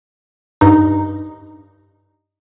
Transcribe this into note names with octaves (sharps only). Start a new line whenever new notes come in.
G2 D#4